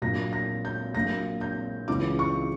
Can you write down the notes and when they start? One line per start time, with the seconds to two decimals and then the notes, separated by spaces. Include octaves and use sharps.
0.02 A#1 A#2 F#3 A#3 A#6
0.33 A#6
0.65 G6
0.95 A#1 A#2 F#3 A#3 A#6
1.41 G6
1.88 C#2 C#3 E3 D6
2.19 C#6